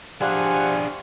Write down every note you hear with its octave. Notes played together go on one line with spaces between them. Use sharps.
D4 G4 G#4 C5 F5 F#5 G#5